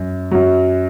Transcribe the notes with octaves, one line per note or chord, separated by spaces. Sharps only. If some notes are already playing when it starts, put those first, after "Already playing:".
Already playing: F#2
F#2 F#3